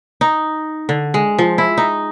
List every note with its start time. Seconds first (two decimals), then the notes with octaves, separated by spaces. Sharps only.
0.21 D#4
0.89 D3
1.14 G#3
1.39 F3
1.58 E4
1.78 D#4